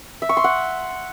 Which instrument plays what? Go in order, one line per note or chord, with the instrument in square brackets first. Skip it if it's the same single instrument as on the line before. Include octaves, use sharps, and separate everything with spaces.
[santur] E5
C#6
C6
F#5